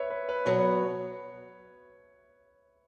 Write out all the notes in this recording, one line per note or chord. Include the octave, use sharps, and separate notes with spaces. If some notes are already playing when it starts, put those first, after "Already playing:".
Already playing: B4 C#5 E5
B4
B4
B2 F#3 B3 C#5